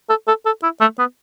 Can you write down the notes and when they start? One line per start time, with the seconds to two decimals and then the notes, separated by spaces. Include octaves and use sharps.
0.09 A4
0.28 A4
0.46 A4
0.63 E4
0.81 A3
0.99 B3